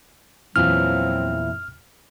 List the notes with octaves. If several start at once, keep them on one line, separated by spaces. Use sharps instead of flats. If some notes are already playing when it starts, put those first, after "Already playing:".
E2 A#2 F3 F#3 C4 E4 F6